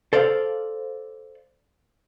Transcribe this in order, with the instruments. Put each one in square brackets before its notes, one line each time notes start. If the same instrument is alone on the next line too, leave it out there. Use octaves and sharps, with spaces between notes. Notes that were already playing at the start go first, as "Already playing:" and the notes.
[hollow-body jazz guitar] A4 C5 D5 F5